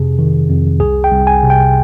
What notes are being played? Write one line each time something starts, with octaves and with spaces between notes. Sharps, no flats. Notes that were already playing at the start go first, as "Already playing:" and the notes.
Already playing: F2 C3 G#4
D#3
F2
C2 G#4
G5
C2
G#5
C3
G5